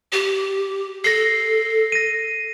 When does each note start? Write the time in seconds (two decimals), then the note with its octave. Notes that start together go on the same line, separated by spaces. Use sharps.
0.12 G4
1.04 A4 A#6 C7
1.92 A#6 D#7